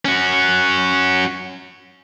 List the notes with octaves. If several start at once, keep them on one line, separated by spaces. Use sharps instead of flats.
C#4 F#4